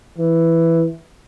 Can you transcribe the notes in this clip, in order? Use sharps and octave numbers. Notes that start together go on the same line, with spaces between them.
E3